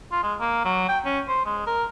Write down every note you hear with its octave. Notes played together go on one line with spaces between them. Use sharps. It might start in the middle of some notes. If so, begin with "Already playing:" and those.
F4
G#3
A#3
F#3
G5
C#4
C5
G#3
A#4